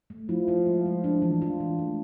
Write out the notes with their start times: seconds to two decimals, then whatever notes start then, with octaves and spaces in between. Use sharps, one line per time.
0.10 A3
0.29 F3 E4
0.48 E4
0.67 G#3
0.86 G#3
1.04 D4
1.22 E3
1.42 F4
1.60 E3
1.79 A3